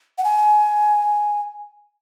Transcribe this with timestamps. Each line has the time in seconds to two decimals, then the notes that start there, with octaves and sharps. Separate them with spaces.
0.18 F#5
0.24 G#5